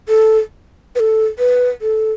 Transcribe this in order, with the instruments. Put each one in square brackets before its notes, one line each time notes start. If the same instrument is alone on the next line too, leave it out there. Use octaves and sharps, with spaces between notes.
[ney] A4
B4
A4
B4
A4